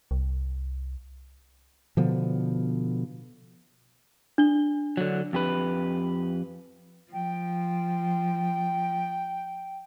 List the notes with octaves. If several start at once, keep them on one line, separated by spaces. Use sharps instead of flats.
C2
B2 D3 F3 B3
D4 G7
D3 F#3
F2 G4 B4
F3 G5